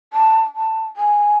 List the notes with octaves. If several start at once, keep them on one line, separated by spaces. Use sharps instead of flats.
A5
A5
G#5